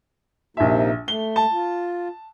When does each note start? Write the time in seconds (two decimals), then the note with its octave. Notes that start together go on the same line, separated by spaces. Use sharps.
0.57 A#1 C3 A#3 D#4 E5
1.08 A3 G7
1.36 A5
1.52 F4